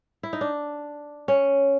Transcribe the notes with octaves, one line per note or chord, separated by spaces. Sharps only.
E4
D#4
D4
C#4